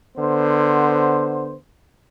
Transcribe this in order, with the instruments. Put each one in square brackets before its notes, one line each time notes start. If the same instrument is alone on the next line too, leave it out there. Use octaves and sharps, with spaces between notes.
[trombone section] D3 B3 C5